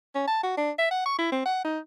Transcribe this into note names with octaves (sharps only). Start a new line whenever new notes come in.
C#4
A5
F#4
D4
E5
F#5
C#6
E4
C4
F#5
D#4